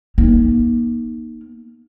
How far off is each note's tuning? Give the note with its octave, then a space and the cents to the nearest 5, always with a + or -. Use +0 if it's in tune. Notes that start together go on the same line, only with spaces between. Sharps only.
A#3 +30 D#4 +0